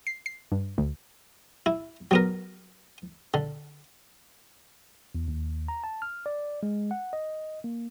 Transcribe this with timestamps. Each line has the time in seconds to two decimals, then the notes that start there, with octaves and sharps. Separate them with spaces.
0.07 C7
0.26 C7
0.52 G2
0.78 D2
1.66 E4
2.11 F#3 B3 A#4
3.34 D3
5.15 E2
5.28 D#2
5.68 A#5
5.84 A5
6.02 F6
6.26 D5
6.63 G#3
6.91 F#5
7.13 D#5
7.64 A#3